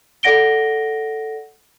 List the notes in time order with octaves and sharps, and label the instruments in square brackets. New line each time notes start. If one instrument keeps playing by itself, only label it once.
[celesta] A4 D5 F#5 A#6 D7 G7